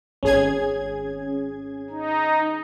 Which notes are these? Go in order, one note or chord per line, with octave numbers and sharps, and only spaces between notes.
G#1 C#4 G#4 G#6
D#4